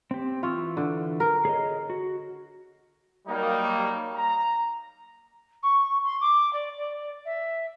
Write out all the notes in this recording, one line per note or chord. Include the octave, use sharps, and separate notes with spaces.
C4 G4
E3 F4 C#6 E6
D3
A#4
G#4 C#5 D#5
F#4
F#3 G3 A#3 D#4
A#5
C#6
C6
D6
D5
D5
E5